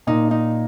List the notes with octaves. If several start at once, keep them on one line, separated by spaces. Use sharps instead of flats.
A#2 D#4
D#4